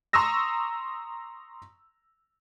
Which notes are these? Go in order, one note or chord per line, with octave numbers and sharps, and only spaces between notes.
A#5 C6 C#6 D#6 E6 A#6